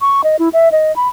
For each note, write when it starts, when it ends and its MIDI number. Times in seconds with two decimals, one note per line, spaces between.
0.01 0.22 85
0.24 0.36 75
0.39 0.49 64
0.53 0.72 76
0.72 0.94 75
0.96 1.08 83